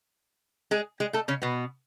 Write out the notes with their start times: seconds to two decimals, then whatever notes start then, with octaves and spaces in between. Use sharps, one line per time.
0.71 G#3 G#4
1.00 G#3 G#4
1.13 A3 A4
1.28 C#3 C#4
1.42 B2 B3